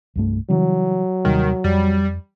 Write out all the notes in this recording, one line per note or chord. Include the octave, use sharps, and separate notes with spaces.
C2 G2 A3
C#3 E3 F#3 G3
D#2 C3 D#3 G3
F2 G3